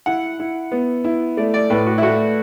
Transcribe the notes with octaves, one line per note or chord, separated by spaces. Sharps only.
E4 F#5
E4
B3
E4
A3 D5
D5
A2 B4
F#4
E4
A3 F#4